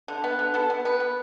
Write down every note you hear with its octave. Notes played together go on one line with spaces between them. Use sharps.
D3
B3 B4
D3
B3 A4
B3
B3 B4
B3